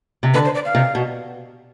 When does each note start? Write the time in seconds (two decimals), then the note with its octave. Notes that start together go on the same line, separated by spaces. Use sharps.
0.23 C3
0.34 D3 B4
0.45 C5
0.55 D5
0.65 F5
0.75 C3
0.95 B2